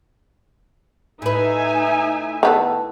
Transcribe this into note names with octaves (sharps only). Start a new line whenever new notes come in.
A2 D#4 B4 E5 G#5
D#3 B3 A4